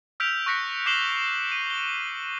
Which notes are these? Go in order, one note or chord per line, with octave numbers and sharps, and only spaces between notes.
E6 F6 G6 B6 D7 F7
C#6 F#6 A#6 B6 C#7 D7
D6 G6 C7 E7 F#7 G7
D#7
G7